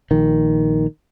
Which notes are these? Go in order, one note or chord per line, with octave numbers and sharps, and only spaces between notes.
A#1 D#3